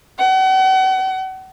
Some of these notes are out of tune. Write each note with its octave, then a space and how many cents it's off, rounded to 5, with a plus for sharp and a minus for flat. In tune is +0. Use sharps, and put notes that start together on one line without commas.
F#5 +40